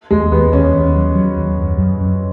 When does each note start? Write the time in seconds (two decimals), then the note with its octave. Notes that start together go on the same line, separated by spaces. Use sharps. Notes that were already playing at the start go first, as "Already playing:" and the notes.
0.11 D#2 G#3
0.32 D#2 B3
0.53 D#2 C#4
0.74 D#2
0.95 F#3
1.15 F#3
1.36 D#2
1.58 F#2
1.78 F#2
2.00 F#2